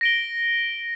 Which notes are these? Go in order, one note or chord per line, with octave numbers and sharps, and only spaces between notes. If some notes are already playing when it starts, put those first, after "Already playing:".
A#6 D7 G7